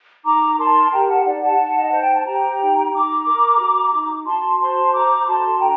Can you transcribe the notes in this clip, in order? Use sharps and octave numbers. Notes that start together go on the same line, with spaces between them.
D#4 A#5 D6
A#4 A5 C6
G4 G5 A#5
F#5 A5
D#4 D5 F#5
F#5 A5
D#4
D#5
C5 F#5
G5
A5
G4 G5 A#5
D#4
D#4 A#5 D6
A#4
F#4
D#4
F#4 A5 C6
C5 A5 C6
A4 A#5 D6
F#4 A5 C6
D4 G5 A#5